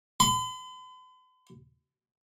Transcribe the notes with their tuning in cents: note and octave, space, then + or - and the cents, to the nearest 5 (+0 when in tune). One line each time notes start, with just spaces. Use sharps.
B5 +45